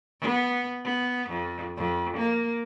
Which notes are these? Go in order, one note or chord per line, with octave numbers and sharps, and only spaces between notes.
B3
B3
F2
F2
A#3